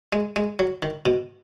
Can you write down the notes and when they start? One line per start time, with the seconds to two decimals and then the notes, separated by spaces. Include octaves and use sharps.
0.13 G#3
0.36 G#3
0.59 F#3
0.82 D#3
1.06 B2